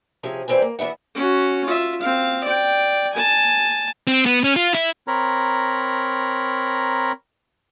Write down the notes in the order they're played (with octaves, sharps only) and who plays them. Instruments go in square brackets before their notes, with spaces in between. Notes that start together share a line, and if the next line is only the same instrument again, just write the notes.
[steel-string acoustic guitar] C3 F3 C#4 G#4
E2 G3 C4 A#4 B4 G#5
A#3
E2 B3 E5 F#5
[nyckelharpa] C#4 F#4
F4 E5
C4 F5
D5 G5
G#5 A5
[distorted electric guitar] C4
B3
C#4
F4
E4
[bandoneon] C4 A#4 C#5 A#5 B5